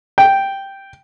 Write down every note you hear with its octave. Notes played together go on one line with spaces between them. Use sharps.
G5